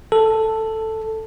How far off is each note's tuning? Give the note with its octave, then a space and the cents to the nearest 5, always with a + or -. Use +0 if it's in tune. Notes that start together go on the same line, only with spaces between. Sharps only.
A4 +5